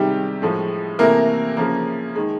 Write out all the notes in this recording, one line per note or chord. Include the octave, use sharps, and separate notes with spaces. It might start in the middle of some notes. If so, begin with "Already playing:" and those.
Already playing: C3 D#3 G3 G#3 G4
A2 F3 G#3
C3 E3 A3 A#3 A#4
C#3 F3 A#3
D#3 G#3